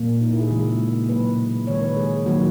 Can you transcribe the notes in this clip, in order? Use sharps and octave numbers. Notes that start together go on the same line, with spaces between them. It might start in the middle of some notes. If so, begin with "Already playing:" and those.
Already playing: A#2 A#3
D#4
E4
G#4
C#3 E3 G#3
B2 F#3 A#3 B4
D#3 G#3 C#5
B4
G#4
D#3 F#3 A#3 F#4